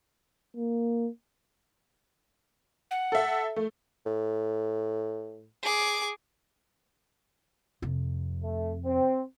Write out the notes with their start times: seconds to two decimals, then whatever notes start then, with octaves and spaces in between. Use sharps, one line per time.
0.57 A#3
2.91 F#5
3.12 A4 E5
3.56 A3
4.06 A2
5.62 G#4 D6
7.82 F2 C3
8.44 A3
8.85 C4